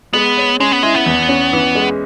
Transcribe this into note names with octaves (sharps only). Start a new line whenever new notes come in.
G#3 B3
C#5
G#3 C#4
B3
G#3 E4
B3
E2
C#4
E3
G#3